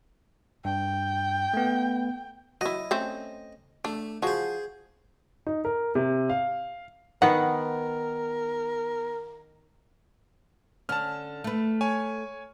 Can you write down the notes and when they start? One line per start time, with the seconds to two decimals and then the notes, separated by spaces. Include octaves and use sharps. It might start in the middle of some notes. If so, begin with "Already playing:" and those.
0.65 G2 G5
1.54 A3 B3
2.61 F#3 E4 D#5
2.91 A3 C4 C#4
3.85 A3 D4
4.22 F3 F#4 G#4 C5
5.47 D#4
5.65 A#4
5.95 C3
6.30 F5
7.22 D#3 B3 A#4 F#5
10.89 D3 C#4 A5 F6
11.44 A3 B4
11.81 C#5 G#5